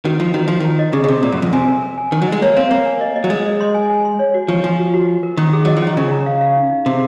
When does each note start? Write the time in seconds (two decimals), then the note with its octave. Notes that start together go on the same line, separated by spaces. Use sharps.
0.05 D#3 F#4
0.20 F3 A#4
0.34 D#3 F#4
0.48 F3 F#4
0.60 D#3 A#5
0.79 D#5
0.93 C#3 G#4
1.04 C#3
1.08 C3 G#4
1.23 A#2 A#4
1.32 F#2
1.38 F2 A#4
1.53 C3 G#5
1.68 A#4
1.82 A#4
1.98 G#5
2.12 D#3 A#4
2.22 F#3
2.27 G#3 D#5
2.42 A#3 C#5
2.57 C4 F5
2.71 A#3 A#4
2.86 G#5
3.01 D#5
3.16 D#5
3.24 F#3
3.30 G#3 D#5
3.46 D#5
3.61 C6
3.74 G#5
3.90 G#5
4.05 C6
4.19 C#5
4.34 F#4
4.48 F3 C#6
4.63 F3 G#5
4.79 F#4
4.94 F#4
5.08 F#4
5.23 A#4
5.37 D#3 C#4
5.53 G#4
5.65 F#3 D#5
5.77 F3
5.82 D#3 C#4
5.97 C#3 A#4
6.11 A#5
6.26 F5
6.41 F5
6.56 D#4
6.71 D#4
6.86 C3 G#4